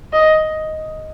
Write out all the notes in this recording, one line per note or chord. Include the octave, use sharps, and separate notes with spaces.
D#5